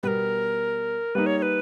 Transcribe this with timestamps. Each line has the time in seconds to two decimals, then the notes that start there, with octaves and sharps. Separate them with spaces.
0.03 B2 G3 B3 A#4 B4
1.15 G3 A#3 D#4 B4
1.26 C#5
1.38 C#5
1.42 B4